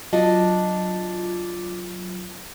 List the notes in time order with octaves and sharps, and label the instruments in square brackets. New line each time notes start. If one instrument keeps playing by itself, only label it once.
[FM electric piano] F#3 F4 [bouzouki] D4 [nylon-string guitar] D#5